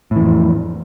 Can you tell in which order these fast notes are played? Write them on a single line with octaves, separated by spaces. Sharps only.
A2 E3 F2